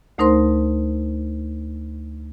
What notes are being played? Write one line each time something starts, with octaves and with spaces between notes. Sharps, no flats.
D2 A3 D#4 A#4 C5 C6